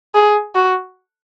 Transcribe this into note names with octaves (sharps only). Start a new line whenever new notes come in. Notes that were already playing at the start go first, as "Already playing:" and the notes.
G#4
F#4